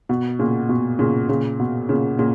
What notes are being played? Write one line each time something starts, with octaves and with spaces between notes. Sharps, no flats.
B2
A#2 C#3
B2
A#2 C#3
A#2 C#3
B2
A#2 C#3
A#2 C#3